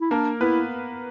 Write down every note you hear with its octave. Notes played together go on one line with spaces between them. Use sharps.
E4
A#3 D4 A#4
B3 E4 B4